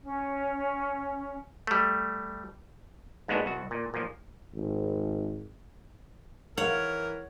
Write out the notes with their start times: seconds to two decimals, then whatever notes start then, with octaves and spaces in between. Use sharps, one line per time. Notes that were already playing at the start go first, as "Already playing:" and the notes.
0.01 C#4
1.67 G3 A3
3.28 G#2 G#3 A#3 B3 D4 F#4
3.46 C2 F#4
3.71 A#2
3.94 A#2 F3
4.55 G#1
6.57 E3 A#4 C#5 F#5